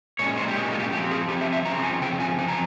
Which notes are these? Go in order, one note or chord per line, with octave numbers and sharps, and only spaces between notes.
A#2 G#3 C#4 C#5
C5
G4
A#2 G#3 C#4 G#4
F4
G4
F3 C4 G4
G#4
F3 C4 G4
E5
E5
C#3 F3 C4 A#5
G#5
C#3 F3 C4 G5
G#5
F3 C4 G#5
A#5